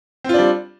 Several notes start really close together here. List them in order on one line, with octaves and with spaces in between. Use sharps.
C4 F4 D4 G3